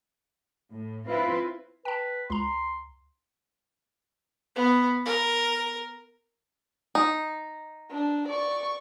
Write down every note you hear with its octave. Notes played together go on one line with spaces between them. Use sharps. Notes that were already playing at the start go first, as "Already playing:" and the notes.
A2
C4 E4 F4 B4
B4 G5 A5
C#2 A#5 C6
B3
A#4
D#4
D4
D5 C#6